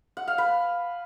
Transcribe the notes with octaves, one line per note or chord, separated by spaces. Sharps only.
F#5
F5
B4